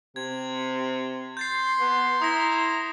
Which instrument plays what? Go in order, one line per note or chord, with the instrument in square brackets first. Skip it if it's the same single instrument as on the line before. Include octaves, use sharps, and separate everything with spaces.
[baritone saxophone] C3 [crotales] G#6
[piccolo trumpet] C6 [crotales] G6 A6 C7
[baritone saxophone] B3
[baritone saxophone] E4 [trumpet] A#5 [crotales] D#6 A#6